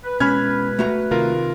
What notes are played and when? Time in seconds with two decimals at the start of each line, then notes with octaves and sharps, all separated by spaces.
0.04 B4
0.20 B2 G#3 C#4 B4 B5 F6 G#6
0.79 A3 F#4 A#5
1.11 C3 D#3 F4 A#4